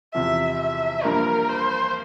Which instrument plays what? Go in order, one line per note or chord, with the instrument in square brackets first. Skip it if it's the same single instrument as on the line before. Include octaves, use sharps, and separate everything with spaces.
[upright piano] E2 C3 F3 [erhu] E5
[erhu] E5
[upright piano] G2 F3 A#3 [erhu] A#4
[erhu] C5